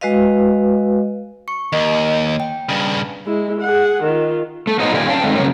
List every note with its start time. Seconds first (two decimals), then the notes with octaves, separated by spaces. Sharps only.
0.01 G#3 F#4 B4 D#5 F5
1.48 C#6 C#7
1.73 D#2 D#5
2.40 G5
2.69 G2 C#3
3.26 G#3 E4
3.61 G#4 F#5
4.03 D#3 F4
4.67 A3
4.79 F#3 B3 D#4 C5 D#5 F#5
4.93 A#2 D3 D#3 G4 D5 G#5
5.07 C#4 F5 G5 A5
5.22 D3 D#3 G#3 A3 C4
5.35 C#3 F#3 A#3 C#4